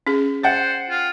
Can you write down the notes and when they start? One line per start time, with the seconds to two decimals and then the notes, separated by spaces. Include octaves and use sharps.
0.07 C#4 G#4
0.43 C5 F#5 G5 A6
0.90 F4